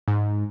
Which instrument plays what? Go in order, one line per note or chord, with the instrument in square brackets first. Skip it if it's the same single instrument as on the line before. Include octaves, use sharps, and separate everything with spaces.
[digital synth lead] G#2